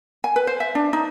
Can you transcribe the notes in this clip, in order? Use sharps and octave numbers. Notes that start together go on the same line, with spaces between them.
G#5
B4
C5
E5
D4
D#4